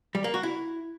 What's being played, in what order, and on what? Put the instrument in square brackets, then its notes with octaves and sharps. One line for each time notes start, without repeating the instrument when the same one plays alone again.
[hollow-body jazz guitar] G3
A#3
F#4
E4